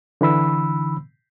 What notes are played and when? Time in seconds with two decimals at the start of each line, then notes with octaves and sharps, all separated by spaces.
0.21 D3 E3 B5 E6